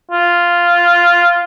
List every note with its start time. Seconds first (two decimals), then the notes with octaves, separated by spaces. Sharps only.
0.11 F4